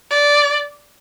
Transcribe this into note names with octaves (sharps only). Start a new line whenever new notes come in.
D5